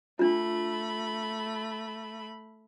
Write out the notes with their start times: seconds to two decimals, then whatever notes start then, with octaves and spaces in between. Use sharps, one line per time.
0.19 A3 D4 F4 B5